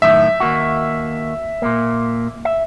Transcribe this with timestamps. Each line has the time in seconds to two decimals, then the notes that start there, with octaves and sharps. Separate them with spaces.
0.02 F#2 A2 D#3 E5
0.40 D#2 A#3 F#4
1.62 A#2 A#3
2.45 E5